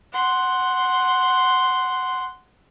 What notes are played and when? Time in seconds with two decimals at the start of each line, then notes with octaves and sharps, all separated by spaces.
0.13 F#5 C6